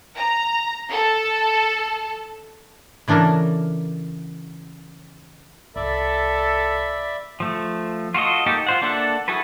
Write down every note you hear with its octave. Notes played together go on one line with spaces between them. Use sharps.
A#5
A4
C#3 E3 D4 A4 A#4
C2 A4 D5 E5 B5
F3 A3
F4 F#4 A4 D#5
A#3 D#4 G4 A4
F4 C5 F#5
A#3 D4 A4 E5 F#5
E4 F#4 G#4 A4 B4